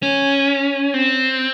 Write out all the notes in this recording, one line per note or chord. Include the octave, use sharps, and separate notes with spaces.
C#4
C4